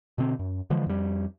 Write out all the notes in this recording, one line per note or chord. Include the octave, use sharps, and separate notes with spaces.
B2 D3 C4
F#2
D3 E3 F3 G#3
F2 G3